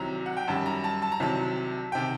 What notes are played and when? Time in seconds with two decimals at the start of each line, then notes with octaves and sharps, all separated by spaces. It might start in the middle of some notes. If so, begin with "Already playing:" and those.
Already playing: C2 C3 D#3 F#3 A#5
0.26 F#5
0.37 G5
0.48 F#2 D#3 G3 A5
0.66 A#5
0.84 A5
1.02 A5
1.12 A#5
1.20 C2 C3 D#3 F#3 A5
1.92 C3 D#3 G5